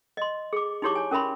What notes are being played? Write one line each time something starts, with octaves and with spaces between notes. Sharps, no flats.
D#5 C6
G#4 D6
D#4 E4 G4 C#5 C#6 D6
C#5 G#5
C#4 A#4 E5 B5 C6